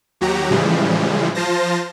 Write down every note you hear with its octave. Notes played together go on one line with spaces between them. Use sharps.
D#2 F#3 F#4 G4 A#5
A2 C#3 E3 F3 G3 G#3
F3 F4 C5 A5 A#6